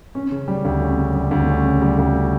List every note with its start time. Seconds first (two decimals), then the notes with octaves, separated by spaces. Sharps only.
0.15 C#4
0.32 C#3
0.48 G3
0.65 D2
0.81 C#4
0.98 C#3
1.15 G3
1.31 D2
1.49 C#4
1.64 C#3
1.81 G3
1.98 D2